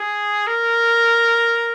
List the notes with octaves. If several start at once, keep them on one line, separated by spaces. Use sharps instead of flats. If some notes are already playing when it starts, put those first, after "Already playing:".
Already playing: G#4
A#4